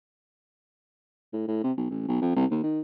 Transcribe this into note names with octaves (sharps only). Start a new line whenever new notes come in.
A2
A2
C3
B1
A1
B1
F2
C2
D#2
D#3